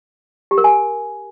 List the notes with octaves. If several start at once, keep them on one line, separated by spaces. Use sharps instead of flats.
G4
A#4
G#5